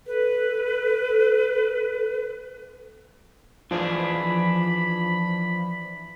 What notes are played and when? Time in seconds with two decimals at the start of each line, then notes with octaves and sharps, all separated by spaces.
0.07 A4 B4
3.71 E3 F3 D4 G#4 B5